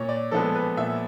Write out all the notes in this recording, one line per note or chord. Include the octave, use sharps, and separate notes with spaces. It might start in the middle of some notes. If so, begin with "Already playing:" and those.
Already playing: A#2 C#5
D5
F3 G#3 B3 A4
B4
A#2 E5